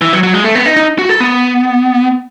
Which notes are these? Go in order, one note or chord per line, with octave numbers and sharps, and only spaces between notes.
E3
F#3
F#3
G#3
A3
B3
D#4
D#4
F#4
A4
B3